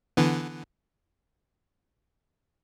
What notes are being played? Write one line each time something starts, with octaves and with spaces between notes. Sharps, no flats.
D3 E3 B3